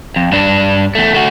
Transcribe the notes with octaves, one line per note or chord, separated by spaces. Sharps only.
F2
G2 D4
E2 A3
A3 F#4